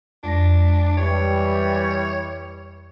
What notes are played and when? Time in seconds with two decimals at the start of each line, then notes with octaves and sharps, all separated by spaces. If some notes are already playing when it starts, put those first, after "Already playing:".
0.23 F2 G#3 D4 A#6
0.97 E3 G3 C#5